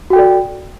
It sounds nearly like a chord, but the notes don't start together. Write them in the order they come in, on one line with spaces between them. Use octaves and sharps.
F#4 G5 A4 D5